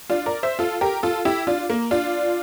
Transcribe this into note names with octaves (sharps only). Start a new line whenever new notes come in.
D4 F4
A#4 D5
C5 E5
F4 A4
G4 A#4
F4 A4
E4 G4
D4 F4
A#3
D4 F4